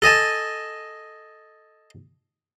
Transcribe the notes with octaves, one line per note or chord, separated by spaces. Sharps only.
A4 D#5 G#5 A5